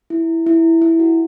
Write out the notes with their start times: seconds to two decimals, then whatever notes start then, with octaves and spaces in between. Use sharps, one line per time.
0.10 E4
0.46 E4
0.82 E4
0.99 F#4